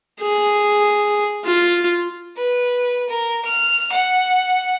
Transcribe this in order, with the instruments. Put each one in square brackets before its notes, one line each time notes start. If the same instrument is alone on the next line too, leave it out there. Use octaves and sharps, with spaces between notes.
[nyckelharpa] G#4
F4
[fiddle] B4
A#4
F6
F#5